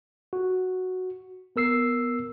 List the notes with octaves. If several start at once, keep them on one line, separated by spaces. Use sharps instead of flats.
F#4
B3 A#4 E6 C7